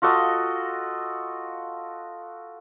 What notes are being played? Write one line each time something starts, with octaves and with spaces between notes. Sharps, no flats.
F4 F#4 A4 D#5